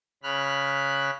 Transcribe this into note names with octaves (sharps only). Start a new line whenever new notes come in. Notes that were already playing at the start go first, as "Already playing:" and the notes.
C#3 B5 F6 F#6